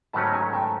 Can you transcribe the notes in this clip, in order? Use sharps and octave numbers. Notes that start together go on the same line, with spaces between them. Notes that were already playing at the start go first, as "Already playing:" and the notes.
G#2 D#3 F#3 A3 C#4 A5 B5
G#5 A#5
G5 A5